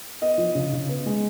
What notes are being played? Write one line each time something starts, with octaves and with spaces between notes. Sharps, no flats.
B3 D#5
F3
C#3
C#3
B3
G#3